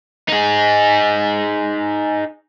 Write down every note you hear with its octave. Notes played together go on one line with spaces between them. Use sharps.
D#4 G#4